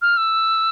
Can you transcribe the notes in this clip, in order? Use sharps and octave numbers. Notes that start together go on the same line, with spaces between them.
F6
E6